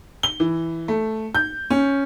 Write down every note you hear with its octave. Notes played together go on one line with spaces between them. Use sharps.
G7
E3
A3
G6
C#4